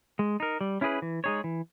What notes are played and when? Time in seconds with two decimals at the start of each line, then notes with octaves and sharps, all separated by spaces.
0.19 G#3
0.40 D#4 A#4
0.61 G3
0.81 C#4 E4 G#4 B4
1.02 E3
1.24 G#3 D#4 G#4 C#5
1.44 E3